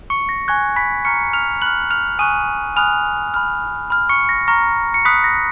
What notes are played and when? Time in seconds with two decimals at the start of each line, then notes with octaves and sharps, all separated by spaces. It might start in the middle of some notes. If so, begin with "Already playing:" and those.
0.10 C#6 C#7
0.29 A#6
0.48 G#5 C#6 F#6 G#6
0.76 B5 B6
1.05 A#5 C#6 F6 C#7
1.33 F6 F7
1.62 B5 F6 F#6 F#7
1.91 F6 F7
2.19 G#5 C#6 D#6 F#6 D#7
2.76 G#5 B5 D#6 F6 F#6 F7
3.34 B5 F6
3.90 B5 F6
4.09 C#6 C#7
4.29 A#6
4.48 A#5 C#6 F6 A#6
4.94 C#7
5.05 B5 D#6 F#6 B6
5.24 A#6